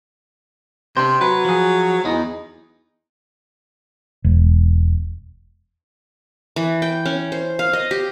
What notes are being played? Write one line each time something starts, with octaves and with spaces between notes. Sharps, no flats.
C3 D4 C5
F#3 B4
F3 G#4
E2 D#4
E1
E3
G5
C#4
C5
F5
D#5
G4